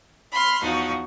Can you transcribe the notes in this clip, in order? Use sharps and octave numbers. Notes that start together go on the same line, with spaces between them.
B5 C6 F6
E2 F3 D#4 F#4